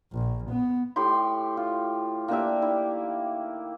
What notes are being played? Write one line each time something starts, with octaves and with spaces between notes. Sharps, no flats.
A#1
B3
A2 G4 B5 C6
F4
A#3 D4 G4 E5
D#3 E4